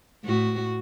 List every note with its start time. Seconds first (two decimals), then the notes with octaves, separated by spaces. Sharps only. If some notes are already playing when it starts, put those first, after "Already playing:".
0.24 A2 F#4